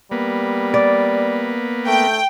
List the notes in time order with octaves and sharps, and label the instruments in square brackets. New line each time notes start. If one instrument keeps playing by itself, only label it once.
[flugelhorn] G3 [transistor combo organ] A#3 B3
[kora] D5
[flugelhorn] A3 [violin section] G5